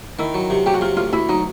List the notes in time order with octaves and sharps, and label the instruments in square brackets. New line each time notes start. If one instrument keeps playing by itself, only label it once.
[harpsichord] D#3 [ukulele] E4
[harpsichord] F#3
C3
[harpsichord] F#3 [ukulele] G4
[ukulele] F#4
[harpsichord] C3 [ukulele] F4
[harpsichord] D2 [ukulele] F4
[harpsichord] D2 [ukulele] E4
[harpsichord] F#3 [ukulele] D#4